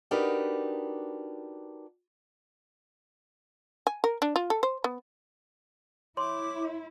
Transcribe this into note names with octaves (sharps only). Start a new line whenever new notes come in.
D4 D#4 F#4 G4 A#4 B4
G#5
A#4
D4
F4
A4
C5
B3
E4 C#5 C6 D6